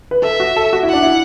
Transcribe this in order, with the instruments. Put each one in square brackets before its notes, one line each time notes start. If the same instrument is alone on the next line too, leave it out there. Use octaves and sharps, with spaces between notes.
[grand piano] B4
[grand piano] A4 [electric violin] E5
[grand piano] F#4
A4
F#4
E4
[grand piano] D4 [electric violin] F#5
[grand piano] E4